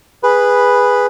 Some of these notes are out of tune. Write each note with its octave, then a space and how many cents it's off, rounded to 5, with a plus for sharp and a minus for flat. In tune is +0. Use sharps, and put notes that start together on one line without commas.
G#4 -10 B4 +0 B5 +0